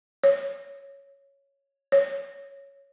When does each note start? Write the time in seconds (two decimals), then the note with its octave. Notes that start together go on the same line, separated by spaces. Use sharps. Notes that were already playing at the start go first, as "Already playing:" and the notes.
0.24 C#5
1.92 C#5